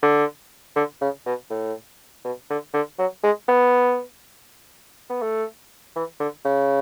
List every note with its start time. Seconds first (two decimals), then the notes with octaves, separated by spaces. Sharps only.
0.02 D3
0.76 D3
1.01 C#3
1.26 B2
1.50 A2
2.24 B2
2.50 D3
2.74 D3
2.98 F#3
3.24 G#3
3.48 B3
5.10 B3
5.22 A3
5.96 E3
6.20 D3
6.45 C#3